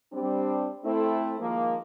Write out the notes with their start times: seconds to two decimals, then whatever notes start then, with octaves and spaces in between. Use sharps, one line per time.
0.13 G3 C4 D4
0.84 A3 C4 E4
1.39 D#3 F3 G#3 A#3